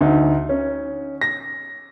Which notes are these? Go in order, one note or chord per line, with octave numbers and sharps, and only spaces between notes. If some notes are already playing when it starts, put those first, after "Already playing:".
D2 D#4
C#4
A#6